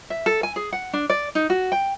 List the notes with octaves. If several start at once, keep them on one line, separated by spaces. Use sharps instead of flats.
E5
A4
G#5
G#4
F#5
D4
D5
D#4
F#4
G5